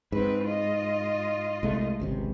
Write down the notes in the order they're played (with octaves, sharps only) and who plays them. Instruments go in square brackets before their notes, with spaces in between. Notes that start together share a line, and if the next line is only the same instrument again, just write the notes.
[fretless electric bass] G#2 [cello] C4 B4
[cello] F4 D#5
[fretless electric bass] C2 G#3 A3
G#1 C#2 C3